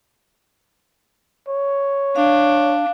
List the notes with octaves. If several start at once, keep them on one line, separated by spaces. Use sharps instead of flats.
C#5
D4 F5